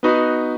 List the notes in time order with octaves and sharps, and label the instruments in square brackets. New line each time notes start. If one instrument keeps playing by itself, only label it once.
[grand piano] B3 D#4 F#4 B4 D#5